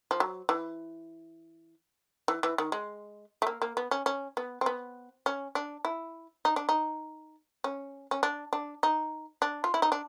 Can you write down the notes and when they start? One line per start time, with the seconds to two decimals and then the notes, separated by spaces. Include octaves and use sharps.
0.11 F3
0.20 F#3
0.49 E3
2.28 E3
2.43 E3
2.58 D#3
2.72 G#3
3.42 A3
3.47 A#3
3.62 A#3
3.77 B3
3.91 C#4
4.06 C#4
4.37 B3
4.61 C4
4.66 B3
5.26 C#4
5.55 D4
5.85 E4
6.45 D#4
6.56 D4
6.69 D#4
7.64 C#4
8.11 C#4
8.23 D4
8.53 D4
8.83 D#4
9.42 D4
9.64 F4
9.74 E4
9.82 D#4
9.92 D4